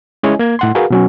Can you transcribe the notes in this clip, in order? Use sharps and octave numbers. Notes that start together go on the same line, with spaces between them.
G#3 C#4 E4 C#5 D#5 G#5
A#3 G#6
A2 F#5 C6
F#4 G#4 A#4 B4 F5
B2 F#3 C#4